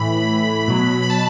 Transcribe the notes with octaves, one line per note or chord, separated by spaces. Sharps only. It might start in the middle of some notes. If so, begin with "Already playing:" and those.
Already playing: A2 E3 B5
B2 F#3
B5
A5